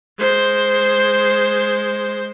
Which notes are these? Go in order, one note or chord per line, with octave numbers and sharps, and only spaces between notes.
G#3 C5